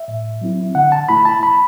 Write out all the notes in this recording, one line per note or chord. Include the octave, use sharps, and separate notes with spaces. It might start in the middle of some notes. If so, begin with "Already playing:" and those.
Already playing: E5
A2
F#3 C4 E4
D3 F#5
A5
A3 E4 B5
A5
B5